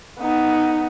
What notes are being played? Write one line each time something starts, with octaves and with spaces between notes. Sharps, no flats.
B3 D#4